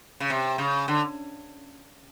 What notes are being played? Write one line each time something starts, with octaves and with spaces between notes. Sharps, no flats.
C#3
C3
C#3
D3